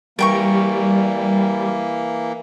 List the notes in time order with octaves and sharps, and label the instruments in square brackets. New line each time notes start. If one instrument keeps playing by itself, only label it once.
[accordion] E3 A#3 [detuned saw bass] G3 [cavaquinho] A#4 G5 C#6